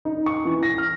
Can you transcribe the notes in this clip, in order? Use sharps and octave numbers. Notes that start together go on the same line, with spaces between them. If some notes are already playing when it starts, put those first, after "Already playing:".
D#4
C#6
E3
A#6
F6